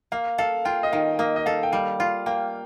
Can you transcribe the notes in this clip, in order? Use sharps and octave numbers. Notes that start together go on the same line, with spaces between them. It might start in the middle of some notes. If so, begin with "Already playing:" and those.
A#3 F5
A4 F5
F4 G5
D#5
D#3 F5
A#3 D#5
D#5
A4 F5
G5
G3 F5
F4 F5
A#3 G5